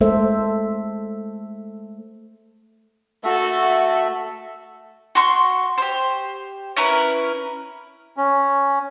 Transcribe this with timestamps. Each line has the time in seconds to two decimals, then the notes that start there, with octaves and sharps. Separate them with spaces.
0.01 G#3 A3 A4 C5 E5
3.24 A3 F#4 A4 E5
5.15 F#4 C6 C#6
5.78 G4 C5
6.76 C#4 E4 A#4 B4
8.17 C#4